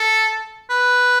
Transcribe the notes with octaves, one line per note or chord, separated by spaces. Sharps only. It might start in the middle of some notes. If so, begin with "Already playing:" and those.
Already playing: A4
B4